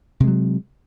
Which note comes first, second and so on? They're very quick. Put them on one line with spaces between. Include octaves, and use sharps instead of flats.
C3 G#3 F#3